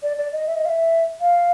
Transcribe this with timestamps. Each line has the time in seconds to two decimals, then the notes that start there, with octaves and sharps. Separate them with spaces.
0.03 D5
0.18 D5
0.33 D#5
0.47 E5
0.56 D#5
0.65 F5
0.69 E5
1.21 F5